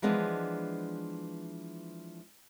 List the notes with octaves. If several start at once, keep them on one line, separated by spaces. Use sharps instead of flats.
E3 F3 G#3 B3 D4